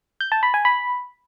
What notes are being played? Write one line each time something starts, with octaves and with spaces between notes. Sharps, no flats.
G6
A5
B5
G#5
B5